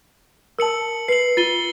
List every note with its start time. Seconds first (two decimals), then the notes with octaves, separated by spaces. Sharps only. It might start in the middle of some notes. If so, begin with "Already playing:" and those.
0.59 A#4 A5 E6 C#7 F#7
1.08 B4 C7 F#7
1.37 F4 A6 D#7 G7